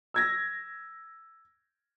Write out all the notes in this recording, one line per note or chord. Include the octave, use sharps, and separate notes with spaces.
E6 G#6 A#6